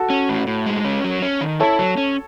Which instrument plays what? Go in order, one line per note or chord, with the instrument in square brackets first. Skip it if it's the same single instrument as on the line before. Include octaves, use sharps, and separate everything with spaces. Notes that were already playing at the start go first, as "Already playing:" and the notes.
Already playing: [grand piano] F#4 A4
[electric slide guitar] C#4
A2
A2
G#3
C#4
F#3
C#4
D#3
[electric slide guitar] E4 [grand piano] A4 C#5
[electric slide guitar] F#3
C#4